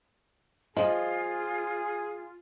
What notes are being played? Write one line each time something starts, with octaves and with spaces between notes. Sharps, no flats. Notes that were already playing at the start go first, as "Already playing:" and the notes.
F3 F4 G#4 D#5